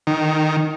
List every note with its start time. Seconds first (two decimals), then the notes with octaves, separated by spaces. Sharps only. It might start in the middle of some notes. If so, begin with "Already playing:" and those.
0.07 D#3